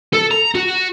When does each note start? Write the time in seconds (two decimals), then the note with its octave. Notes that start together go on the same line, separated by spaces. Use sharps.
0.13 A4
0.31 A#5
0.55 F#4